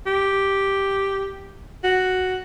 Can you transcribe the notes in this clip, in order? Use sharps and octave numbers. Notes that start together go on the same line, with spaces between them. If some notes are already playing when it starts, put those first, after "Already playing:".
G4
F#4